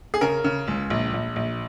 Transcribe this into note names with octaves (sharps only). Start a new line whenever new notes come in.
G#4
C#3 A#4
C#3
C#2
A#1
A#1
A#1